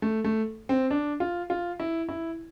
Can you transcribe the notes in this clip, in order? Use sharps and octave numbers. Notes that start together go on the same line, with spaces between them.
A3
A3
C4
D4
F4
F4
E4
E4